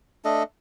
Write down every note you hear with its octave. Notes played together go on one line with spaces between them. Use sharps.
A3 D4 A4 D#5